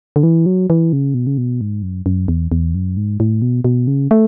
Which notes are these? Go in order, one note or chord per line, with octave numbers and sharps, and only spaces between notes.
D3
E3
F#3
E3
C#3
B2
C#3
B2
G#2
F#2
F#2
E2
E2
F#2
G#2
A2
B2
B2
C#3
A3